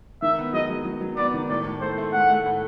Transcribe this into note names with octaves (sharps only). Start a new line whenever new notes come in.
D#3 E5
B3
F#3 D#5
F#3
F#3
F#3
B3 D5
D#3
A2 D5
A2
A3 C5
A3
A3 F#5
A3
A2